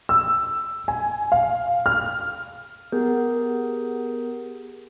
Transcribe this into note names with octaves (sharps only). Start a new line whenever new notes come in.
E6
G#5
F5
F6
B3 G4 G#4 A#4 G6